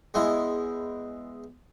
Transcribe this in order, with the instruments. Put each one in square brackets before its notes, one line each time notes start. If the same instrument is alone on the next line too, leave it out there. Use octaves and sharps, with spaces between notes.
[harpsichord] E2 G#3 E4